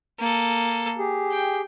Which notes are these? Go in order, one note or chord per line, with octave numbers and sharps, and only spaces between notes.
A#3 A4
G4 G#4
G5